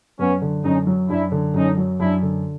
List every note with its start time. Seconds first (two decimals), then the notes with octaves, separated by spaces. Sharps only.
0.19 F#2 B3 C#4
0.42 D3
0.64 F#2 C#4 D#4
0.87 F#3
1.09 F#2 D4 E4
1.32 D3
1.54 F#2 C#4 D#4
1.77 F#3
2.00 F#2 D4 E4
2.22 D3